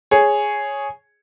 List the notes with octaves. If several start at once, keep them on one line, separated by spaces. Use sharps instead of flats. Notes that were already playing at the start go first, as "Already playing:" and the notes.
G#4 C#5